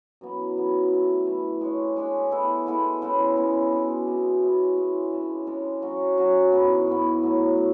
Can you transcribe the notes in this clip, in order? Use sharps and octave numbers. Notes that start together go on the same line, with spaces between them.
F#2 E3 B3
F#2 E3 B3
E3 A3 E4
E3 A3 E4
G#3 D4 G#4 C#5
G#3 D4 G#4 C#5
G#3 B3 E4 A4
G#3 B3 E4 A4
C#3 G#3 B3 E4
C#3 G#3 B3 E4
B2 G#3 D4 G#4
B2 G#3 D4 G#4
G#3 C#4 E4
G#3 C#4 E4
C#3 G#3 D4
C#3 G#3 D4
F#3 C#4 F#4
F#3 C#4 F#4
G#2 E3 B3
G#2 E3 B3
A2 F#3 A3
A2